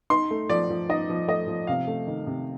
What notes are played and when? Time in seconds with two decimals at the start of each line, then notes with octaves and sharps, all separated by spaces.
0.10 D#4 C6
0.31 A3
0.49 F3 D5
0.70 F3
0.89 D#4 D#5
1.09 F3
1.28 A3 D#5
1.48 F3
1.67 C3 F5
1.87 A3
2.07 D#3
2.27 C3